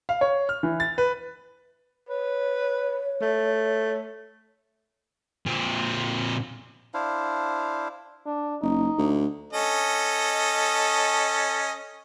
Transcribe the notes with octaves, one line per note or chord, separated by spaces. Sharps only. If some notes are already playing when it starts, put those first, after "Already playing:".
F5
C#5
F6
E3
A6
B4
B4 C#5
A3
A#2 C4
D4 E4 C5 F5
D4
F#1 D#4
D2
C#4 A4 D#5